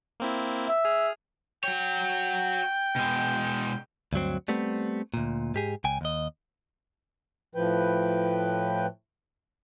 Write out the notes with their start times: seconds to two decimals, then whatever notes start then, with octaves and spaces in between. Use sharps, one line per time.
0.20 A#3 C4 E4
0.67 E5
0.85 G#4 F6
1.64 F#4 C#5 G5
2.96 B2 G#3
4.13 D2 G2 F#3 C4
4.48 G3 A3 B3 C4
5.14 D2 A#2
5.54 G#2 G4 G#4
5.84 C#2 G5 G#5
6.01 D#2 D#5
7.55 A2 F3 B4 G5